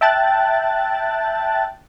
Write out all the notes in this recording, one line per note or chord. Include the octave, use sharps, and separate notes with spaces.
E5 G5 A5 F#6 A6